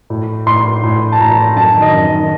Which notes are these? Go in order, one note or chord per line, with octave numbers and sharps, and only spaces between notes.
A2
A2 C6
A2
A5
A2 A#5
F#2 A5
D#3
D#5
F#2
D#3